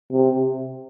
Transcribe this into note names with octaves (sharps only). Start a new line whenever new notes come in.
C3